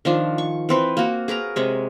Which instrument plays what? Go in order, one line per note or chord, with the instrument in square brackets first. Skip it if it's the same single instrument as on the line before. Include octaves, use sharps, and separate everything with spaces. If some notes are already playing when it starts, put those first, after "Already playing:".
[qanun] D#3 F3 D4
C#6
E3 C4 B4
A#3 F#4
G#4 A#4 B4 A#5
C3 G#3 C#5